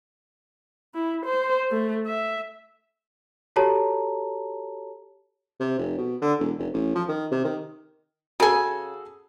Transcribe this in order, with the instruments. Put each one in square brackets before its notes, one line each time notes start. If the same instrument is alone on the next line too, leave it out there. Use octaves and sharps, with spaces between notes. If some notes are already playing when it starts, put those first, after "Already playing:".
[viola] E4
C5
A3
E5
[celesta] F#4 G4 A4 C#5 A5 A#5
[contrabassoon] C3
F1
B2
D3
E1
F1
A1
F3
D#3
C3
D#3
[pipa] C#3 G#5 [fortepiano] F#4 G#4 A4